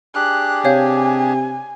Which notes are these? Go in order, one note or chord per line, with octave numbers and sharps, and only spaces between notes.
D4 G4 G#4 F#6
C3 C#5 F5 G#5 G6